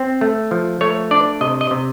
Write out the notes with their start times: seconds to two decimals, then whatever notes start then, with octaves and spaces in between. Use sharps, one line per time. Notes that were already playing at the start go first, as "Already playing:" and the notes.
Already playing: C4
0.21 A3
0.51 F3
0.81 A3 C#5
1.11 D4 D5
1.41 C3 D#5
1.61 D#5
1.71 C3